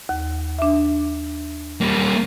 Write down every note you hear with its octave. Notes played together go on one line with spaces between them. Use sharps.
D#2
D4 E5
G3 A#3